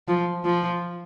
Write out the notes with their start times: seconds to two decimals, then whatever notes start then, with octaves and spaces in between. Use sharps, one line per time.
0.08 F3
0.45 F3